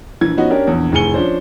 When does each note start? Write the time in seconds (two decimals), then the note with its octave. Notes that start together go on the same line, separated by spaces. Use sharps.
0.21 A#1 E3 G#6
0.37 F3 B3 C#4 D#4 F#4
0.50 C#4 D4 G4 A#4 C#5
0.67 A#1 E2
0.92 F1 A2 G#4 G#5 C#7 G7
1.14 F3 C#4 D4 C5